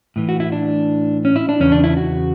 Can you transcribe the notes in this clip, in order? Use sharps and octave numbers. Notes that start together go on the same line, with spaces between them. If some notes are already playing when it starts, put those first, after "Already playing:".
A2 E3
F#4
E4
D4
C#4
E4
D4
E2 C#3 C#4
D4
E4
F#4